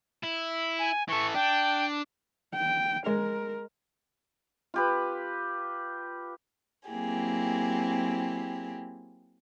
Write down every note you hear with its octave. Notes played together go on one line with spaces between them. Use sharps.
E4
G#5
E3 A4 C#6
D4 G5
G5
G#3 A#4
F4 G4 B4
F#3 A#3 C4 E4 G4 G#4